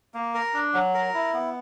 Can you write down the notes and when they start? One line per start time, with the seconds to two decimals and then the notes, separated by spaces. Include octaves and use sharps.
0.14 A#3
0.34 A#4
0.54 D4
0.73 F#3
0.94 A#4
1.14 E4
1.33 B3